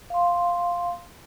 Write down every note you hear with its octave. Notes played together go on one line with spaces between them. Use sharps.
F5 C6